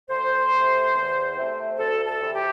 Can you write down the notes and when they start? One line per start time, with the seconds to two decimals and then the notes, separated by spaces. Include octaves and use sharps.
0.09 D2 C5
0.52 C3 A3
0.94 E2
1.35 C3 A3 C4
1.78 D2 A4
2.07 A4
2.20 C3 E3
2.34 G4